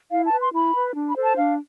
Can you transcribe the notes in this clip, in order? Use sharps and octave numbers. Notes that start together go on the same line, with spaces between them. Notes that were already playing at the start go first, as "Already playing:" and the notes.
E4 F5
A5
B4
C6
E4 B5
B4
D4
B5
A4 C5
A5
D4 F5